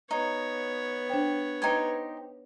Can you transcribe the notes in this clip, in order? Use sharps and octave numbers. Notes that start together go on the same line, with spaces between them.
B3 D#4 C#5
D4 C5 G5
D#4 G4 B4 C5 G#6